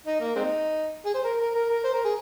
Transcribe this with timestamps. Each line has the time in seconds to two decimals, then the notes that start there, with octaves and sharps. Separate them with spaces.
0.06 D#4
0.20 A#3
0.36 G#3 C4 D#4
1.06 G#4
1.14 C5
1.24 A#4
1.40 A#4
1.55 A#4
1.70 A#4
1.84 C5
1.94 A#4
2.05 G#4